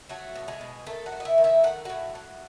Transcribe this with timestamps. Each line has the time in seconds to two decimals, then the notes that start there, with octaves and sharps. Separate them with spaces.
0.09 F#3 A3 F#4
0.35 B2
0.48 G#3 G#4
0.61 B2
0.86 D#3 A3 A4
1.06 F#4 F#5
1.12 A3
1.20 D#5
1.25 E4 E5
1.38 D#3
1.44 E4 E5
1.64 A3 F#5
1.85 A2 F#4 F#5
2.15 A2